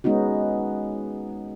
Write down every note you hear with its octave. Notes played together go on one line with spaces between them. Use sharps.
G#3 B3 C#4 D#4 F#4